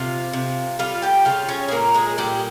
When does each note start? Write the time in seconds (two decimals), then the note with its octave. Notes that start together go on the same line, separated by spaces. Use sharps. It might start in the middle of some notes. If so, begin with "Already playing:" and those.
Already playing: C3 F4 F5
0.33 C3
0.79 G3 F4 F5
1.02 G4 G5
1.25 C#3 F4 F5
1.49 C#4 C#5
1.68 G#4
1.71 A#2 A#3 A#4
1.94 G#3 G#4
2.18 A#2 G3 G4